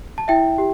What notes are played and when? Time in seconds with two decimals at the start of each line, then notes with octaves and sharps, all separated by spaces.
0.18 A5
0.28 E4 E5 G5
0.58 G4